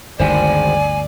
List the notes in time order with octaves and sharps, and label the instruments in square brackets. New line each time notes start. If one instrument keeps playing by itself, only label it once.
[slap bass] G1 D2 [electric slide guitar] G#2 D#3 C5 [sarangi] D5 [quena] G#5